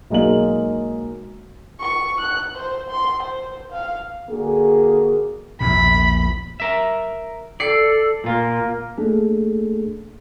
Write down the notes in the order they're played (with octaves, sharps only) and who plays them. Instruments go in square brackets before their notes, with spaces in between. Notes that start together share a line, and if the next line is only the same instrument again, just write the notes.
[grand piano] B1 G#3 A#3 D#4 F#7
[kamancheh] C#6
F#6
C5
C6
C5
F5
[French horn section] D3 A#3 F#4 G#4
[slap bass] A#1 E2 A#2 [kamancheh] B5
[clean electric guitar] A#4 E5
[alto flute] A4 [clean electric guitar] D5 [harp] C7 C#7
[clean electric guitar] A#2 F4 [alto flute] A#3
[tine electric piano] A3 A#3 D4 G#4 A4